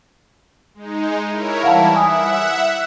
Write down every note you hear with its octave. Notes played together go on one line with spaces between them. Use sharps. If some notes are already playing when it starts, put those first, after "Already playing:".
G#3 D#4
E4 A#4 C#5
E3 G3 E4 F5 F#5 A5
E5 F#5 G#5 D#6